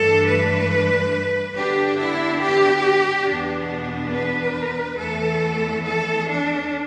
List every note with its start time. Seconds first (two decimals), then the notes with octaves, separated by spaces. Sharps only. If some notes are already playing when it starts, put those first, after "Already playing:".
Already playing: G2 E3 A3 D4 A4
0.25 B4
1.55 D3 B3 D4 G4
1.97 E4
2.41 G4
3.26 E2 B2 B3 D4
4.13 B4
4.99 E2 E3 A3 A4
5.85 A4
6.28 D4